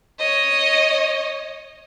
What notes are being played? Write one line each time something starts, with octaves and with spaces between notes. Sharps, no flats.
C#5 D#5